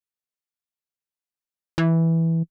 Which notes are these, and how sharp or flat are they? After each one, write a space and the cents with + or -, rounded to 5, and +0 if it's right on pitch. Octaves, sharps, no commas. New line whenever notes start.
E3 -5